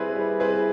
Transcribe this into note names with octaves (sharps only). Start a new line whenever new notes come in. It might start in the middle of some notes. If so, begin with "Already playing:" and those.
Already playing: G3 C4 E4 G#4 B4
G3
C4 E4 G#4 B4